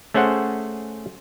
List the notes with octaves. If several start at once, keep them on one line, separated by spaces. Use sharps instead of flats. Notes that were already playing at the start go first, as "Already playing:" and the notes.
A3 C#4 G#4 C5 F#5